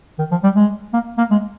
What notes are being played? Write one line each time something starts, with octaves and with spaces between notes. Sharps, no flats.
D#3
F3
G3
G#3
A#3
A#3
G#3